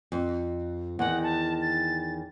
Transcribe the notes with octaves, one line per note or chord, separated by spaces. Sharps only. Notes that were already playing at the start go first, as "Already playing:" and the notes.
F2
E2 D#3 F#5
A5
A6